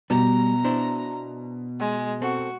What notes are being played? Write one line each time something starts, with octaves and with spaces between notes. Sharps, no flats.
B2 G3 A#5
D4 E4 C5
G#3
C4 F#4 A4